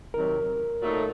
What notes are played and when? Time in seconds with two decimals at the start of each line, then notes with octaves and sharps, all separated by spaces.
0.14 C3 D#3 F#3 A#4
0.81 A#2 F#3 A3 D#4